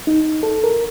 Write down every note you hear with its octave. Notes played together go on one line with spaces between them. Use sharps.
D#4
A4
A#4